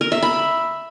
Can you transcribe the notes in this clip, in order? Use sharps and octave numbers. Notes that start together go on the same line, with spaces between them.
A#4
E5
B5